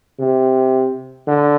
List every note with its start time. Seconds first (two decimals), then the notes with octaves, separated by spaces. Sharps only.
0.20 C3
1.28 D3